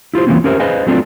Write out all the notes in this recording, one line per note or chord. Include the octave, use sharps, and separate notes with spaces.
E4 F4 G4 C5
E3 F#3 A#3 C4 C#4
C#4 G4 A#4 C5 D#5 E5
G#4 B4 C5 D#5 F5 G#5
F#3 A3 C4 D4 F4